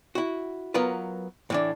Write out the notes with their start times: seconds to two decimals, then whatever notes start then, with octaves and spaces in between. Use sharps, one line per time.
0.15 E4 F#4
0.74 F#3 B3 F4 A#4 B4
1.50 A2 E3 D4